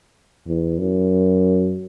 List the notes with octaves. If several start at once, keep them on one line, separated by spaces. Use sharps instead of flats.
E2
F#2